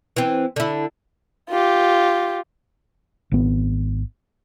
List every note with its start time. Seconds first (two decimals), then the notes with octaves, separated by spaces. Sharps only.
0.16 E3 C4
0.56 D3 E4
1.50 F4 G4
3.31 G#1 B3